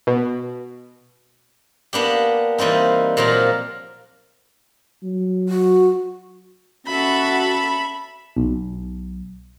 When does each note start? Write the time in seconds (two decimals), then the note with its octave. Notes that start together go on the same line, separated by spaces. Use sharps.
0.07 B2
1.93 A#3 B3 D4 G4
2.58 E3 G3 A#3 C4 D#4
3.17 A#2 F3 F#3 F4 A#4
5.03 F#3
5.49 F#4
6.86 C#4 F#4 A4 E5 B5
8.37 B1